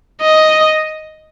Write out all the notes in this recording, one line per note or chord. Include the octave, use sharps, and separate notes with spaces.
D#5